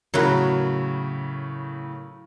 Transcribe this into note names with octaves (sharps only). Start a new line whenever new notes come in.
A2 C#3 F#3 A#4 B4